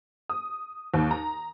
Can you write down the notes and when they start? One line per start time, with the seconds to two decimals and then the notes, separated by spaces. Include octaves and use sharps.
0.29 D#6
0.94 D#2
1.11 A#5